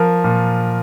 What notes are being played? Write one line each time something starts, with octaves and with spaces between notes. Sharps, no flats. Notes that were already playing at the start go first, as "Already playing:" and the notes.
Already playing: F3 A#4
A#2